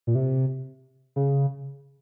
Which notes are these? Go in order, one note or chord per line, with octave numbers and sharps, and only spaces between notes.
A#2
C3
C#3